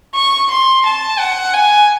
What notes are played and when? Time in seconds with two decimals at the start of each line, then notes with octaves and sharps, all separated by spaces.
0.15 C#6
0.50 C6
0.85 A5
1.19 F#5
1.54 G#5